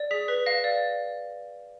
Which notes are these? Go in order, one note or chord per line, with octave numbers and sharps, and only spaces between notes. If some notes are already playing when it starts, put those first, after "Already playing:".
Already playing: D5
G#4 B6
B4 B6
F5 A#6
D5